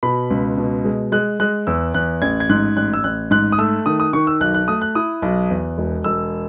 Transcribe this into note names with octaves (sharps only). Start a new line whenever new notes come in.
B2 B5
C#2
B2
G#3
G#3 F#6
G#3 F#6
E2 E6
E2 F#6
A1 G#6
G#6
G#2 F#6
A1 F#6
E6
A1 F#6
G#2 F#6
D#6
A3 E6
D#3 D#6
D#6
D#3 C#6
E6
B1 F#6
F#6
A3 D#6
F#6
E4 D#6
B1
E2
E1
E1 E6